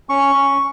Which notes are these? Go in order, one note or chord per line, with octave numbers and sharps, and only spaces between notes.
C#4 C#6
C#4